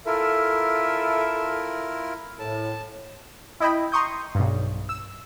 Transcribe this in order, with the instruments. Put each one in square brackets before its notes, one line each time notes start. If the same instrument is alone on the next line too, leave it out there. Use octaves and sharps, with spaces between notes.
[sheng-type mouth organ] E4 F4 A#4 [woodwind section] A4 E5
[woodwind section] A2 [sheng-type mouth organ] A5
[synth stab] E4 D#5 G5 B5
A#5 C6 C#6 D#6 G6
B1 G2
E6